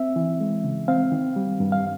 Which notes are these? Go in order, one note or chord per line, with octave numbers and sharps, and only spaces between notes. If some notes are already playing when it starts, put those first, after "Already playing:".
Already playing: C4 E5
E3
G#3
C#3
C4 F5
D#3
G3
G2
F5